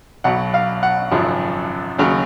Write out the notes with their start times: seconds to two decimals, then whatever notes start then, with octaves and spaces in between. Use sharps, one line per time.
0.24 B1 B2 F#3 F#5
0.54 F5
0.83 F#5
1.11 G#1 F#2 C#3 F3
1.98 D#2 C#3 F#3